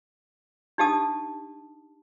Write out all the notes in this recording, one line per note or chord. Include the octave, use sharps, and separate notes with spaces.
D4 D#4 G4 F5 A5 D#6